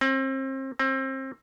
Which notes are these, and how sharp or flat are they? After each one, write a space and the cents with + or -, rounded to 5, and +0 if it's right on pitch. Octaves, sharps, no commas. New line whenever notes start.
C4 +35
C4 +30